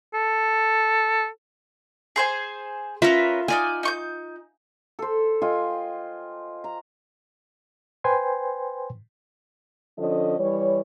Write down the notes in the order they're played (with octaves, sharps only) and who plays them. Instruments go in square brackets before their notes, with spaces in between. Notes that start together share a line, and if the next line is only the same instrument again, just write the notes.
[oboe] A4
[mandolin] G#4 C5 G#5
[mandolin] C#4 A#4 B4 [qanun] F4 E5
[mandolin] D#4 D5 F6 [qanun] G#5
[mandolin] D#4 C#6 G6
[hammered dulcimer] A4 C5
F4 D#5 G5 G#5
A#5
[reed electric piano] B4 C5 G5 G#5 C6
[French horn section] D3 F3 C#4 A4 D#5
E3 G3 C#5